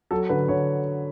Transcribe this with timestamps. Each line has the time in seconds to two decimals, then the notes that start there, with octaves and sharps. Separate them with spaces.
0.11 F#3 A4
0.29 D3 B4
0.48 D3 C#5